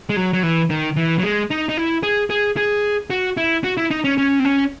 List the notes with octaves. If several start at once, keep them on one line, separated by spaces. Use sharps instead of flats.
G#3
F#3
F#3
E3
D#3
E3
F#3
G#3
D#4
D#4
E4
G#4
G#4
G#4
F#4
E4
F#4
E4
D#4
C#4
C#4
C4
C#4